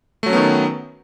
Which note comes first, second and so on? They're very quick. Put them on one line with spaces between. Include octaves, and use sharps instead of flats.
A3 F#3 C#4 B3 D#3